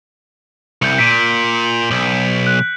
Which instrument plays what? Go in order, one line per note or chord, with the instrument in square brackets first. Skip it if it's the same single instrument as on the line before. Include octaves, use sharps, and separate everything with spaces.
[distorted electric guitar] C2 [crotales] G6 C#7
[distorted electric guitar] A#2 [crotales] B6 D7
[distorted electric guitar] B1 [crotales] F#7
[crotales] F#6